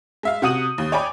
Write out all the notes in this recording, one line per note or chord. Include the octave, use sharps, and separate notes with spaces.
G#3 E5 F5
C3 F#4 F#5 D#6 D#7 F#7
D#2
C#5 D5 G5 G#5 B5 D6